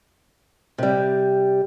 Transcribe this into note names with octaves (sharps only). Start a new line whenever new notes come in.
C3 G3